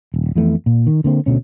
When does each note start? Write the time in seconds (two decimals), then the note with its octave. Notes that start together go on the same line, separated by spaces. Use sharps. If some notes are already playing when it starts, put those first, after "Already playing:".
0.14 D#1
0.35 F2 E3 A3 B3
0.66 A#2
0.87 D#3
1.04 D3 A#3 C4
1.26 D2 B2 C#4